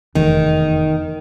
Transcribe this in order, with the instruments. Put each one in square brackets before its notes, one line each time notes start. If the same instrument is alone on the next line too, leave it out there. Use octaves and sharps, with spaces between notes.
[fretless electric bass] F1 E2 [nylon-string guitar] D#3